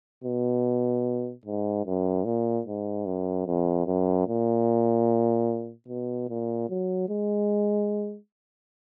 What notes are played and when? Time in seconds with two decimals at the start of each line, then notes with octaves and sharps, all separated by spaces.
0.24 B2
1.46 G#2
1.86 F#2
2.25 A#2
2.67 G#2
3.06 F#2
3.47 F2
3.87 F#2
4.28 A#2
5.88 B2
6.29 A#2
6.70 F#3
7.09 G#3